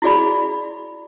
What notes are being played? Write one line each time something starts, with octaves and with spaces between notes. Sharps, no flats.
E4 F#4 G#4 D5 B5